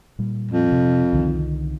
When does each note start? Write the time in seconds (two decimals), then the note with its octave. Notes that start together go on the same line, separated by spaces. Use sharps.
0.19 A#2 G3
0.51 F2
0.72 C3
1.13 C2 D3 D#3